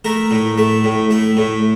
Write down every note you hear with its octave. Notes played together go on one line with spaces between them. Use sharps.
A3 A#4
A2
A3
A2
A3
A2